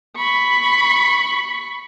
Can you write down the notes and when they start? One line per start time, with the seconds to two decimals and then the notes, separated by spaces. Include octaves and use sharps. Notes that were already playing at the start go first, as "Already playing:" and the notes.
0.16 B5 C#6